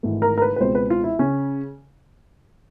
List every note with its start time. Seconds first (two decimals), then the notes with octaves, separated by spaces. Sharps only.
0.03 G#1 G#2 E3 A3
0.22 A#4
0.38 A#4
0.42 B4
0.56 B4
0.60 C#2 B2 G#3 C4 C5
0.75 B4
0.90 F4
1.04 E4
1.19 C#3 C#4